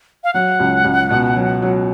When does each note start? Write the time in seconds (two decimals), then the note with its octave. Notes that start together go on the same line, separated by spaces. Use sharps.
0.24 F5
0.34 F#3 F#5
0.60 C#2
0.85 C#2
1.10 B2
1.36 F#3
1.62 F#3